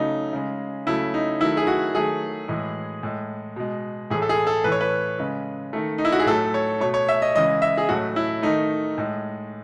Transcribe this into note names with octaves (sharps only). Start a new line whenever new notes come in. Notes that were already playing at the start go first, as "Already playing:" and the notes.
Already playing: C#3 F#3 A3 D#4
C#3 G#3
C#3 F#3 A3 E4
D#4
D#3 F#3 A3 E4
G#4
F#4
D#3 F#3 A3 G#4
A2 E3 G#3
A2 G#3
B2 G#3
A2 E3 A3 G#4
A4
G#4
A4
A2 E3 A3 B4 C#5
B4
C#3 G#3
D#3 A3
D#4
E4
F#4
G#4
A2 F#3 A3 A4
C#5
B2 A3 C#5
C#5
E5
D#5
C#3 E3 G#3 D#5
E5
G#4
A2 F#3 A3 F#4
E4
D#3 A3 D#4
A2 G#3